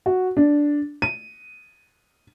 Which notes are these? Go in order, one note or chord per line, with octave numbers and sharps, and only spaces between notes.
F#4
D4
D#7